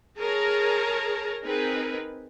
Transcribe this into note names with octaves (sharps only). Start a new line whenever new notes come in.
G#4 A#4 C#5 A5 A#5
C4 D#4 G#4 A#4 B4